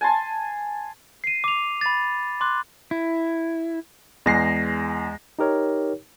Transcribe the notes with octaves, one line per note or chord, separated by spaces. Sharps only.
G#5 A5 C6
C7 D#7
D6 F7
B5 A6
C6 D6 F#6
E4
E2 G#3 A#6 C7
D#4 G4 A#4 C#5